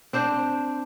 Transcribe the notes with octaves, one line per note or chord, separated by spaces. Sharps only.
C4 D4 C5